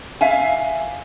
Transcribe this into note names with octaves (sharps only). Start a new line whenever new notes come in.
E5 F5 G#5